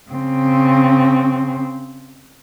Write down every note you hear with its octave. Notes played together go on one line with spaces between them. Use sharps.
C#3 C4